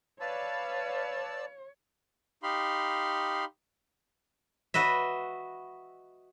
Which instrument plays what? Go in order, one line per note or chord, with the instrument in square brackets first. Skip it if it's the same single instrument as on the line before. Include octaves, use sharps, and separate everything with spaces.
[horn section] B4 [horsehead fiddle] C#5 [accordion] D5 A5 E6 [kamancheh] F5
[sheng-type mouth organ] D#4 G4 F5 B5 C6
[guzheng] F#4 B4 D#5 E5